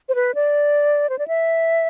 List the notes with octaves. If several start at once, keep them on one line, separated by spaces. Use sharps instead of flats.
C5
B4
D5
C5
D5
E5